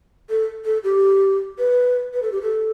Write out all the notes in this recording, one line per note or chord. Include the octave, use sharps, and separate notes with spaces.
A4
A4
G4
B4
B4
A4
G4
A4